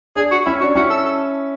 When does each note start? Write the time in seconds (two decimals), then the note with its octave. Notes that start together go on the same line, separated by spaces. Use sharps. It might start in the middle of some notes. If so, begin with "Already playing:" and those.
0.16 D4 G#4
0.31 F#4
0.46 C#4 E4
0.61 D4 F#4
0.76 C#4 E4 F#4
0.90 A4
1.05 A4